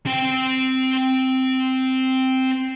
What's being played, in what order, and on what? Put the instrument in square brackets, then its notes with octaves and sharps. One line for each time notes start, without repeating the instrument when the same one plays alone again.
[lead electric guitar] C4 G5